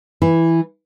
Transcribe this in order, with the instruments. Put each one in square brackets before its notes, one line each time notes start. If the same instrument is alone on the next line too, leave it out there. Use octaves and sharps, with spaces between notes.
[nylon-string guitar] E3 E4